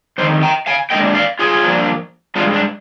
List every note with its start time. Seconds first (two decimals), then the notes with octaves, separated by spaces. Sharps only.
0.18 F2 D#3 C5
0.43 G5 A#5
0.66 F5 G#5
0.90 A#2 G#3 D4 D#5 G5
1.15 D5 F5
1.39 F4 G#4
1.63 G2 F3 A#3 D4
2.35 G2 D#3 G#3 D4 F4
2.54 D4